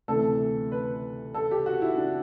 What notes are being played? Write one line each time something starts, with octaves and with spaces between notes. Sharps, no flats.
D2 C3 E3 A4
B4
A4
G4
F#4
E4
D4